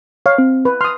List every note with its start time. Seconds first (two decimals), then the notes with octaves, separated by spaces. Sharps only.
0.26 C#5 F5
0.38 C4
0.65 B4
0.81 C6 D#6 F6